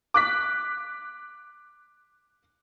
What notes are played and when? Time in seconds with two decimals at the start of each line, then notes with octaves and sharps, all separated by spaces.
0.14 D6 F#6 B6